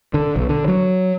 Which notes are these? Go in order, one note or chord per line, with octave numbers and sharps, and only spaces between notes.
D3
B1
D3
F#3